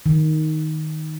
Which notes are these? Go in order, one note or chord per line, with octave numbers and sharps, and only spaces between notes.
D#3